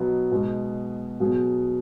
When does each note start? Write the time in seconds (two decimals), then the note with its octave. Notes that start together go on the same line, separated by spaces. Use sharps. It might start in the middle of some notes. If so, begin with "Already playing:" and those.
Already playing: B2 F#3 B3 D#4
0.31 B2 G#3 D#4
1.20 B2 F#3 B3 G#4